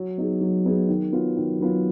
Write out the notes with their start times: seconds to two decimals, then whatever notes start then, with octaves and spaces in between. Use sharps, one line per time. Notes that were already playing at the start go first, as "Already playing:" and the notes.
Already playing: F#3
0.18 B3 D#4 G#4
0.41 F#3
0.66 B3 D#4 G#4
0.89 D#3
1.13 F#3 B3 F4
1.37 D#3
1.60 F#3 B3 F4